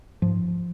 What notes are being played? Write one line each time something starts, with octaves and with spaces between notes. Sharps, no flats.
G#2 F3